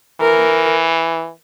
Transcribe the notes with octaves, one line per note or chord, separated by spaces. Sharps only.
E3 A#4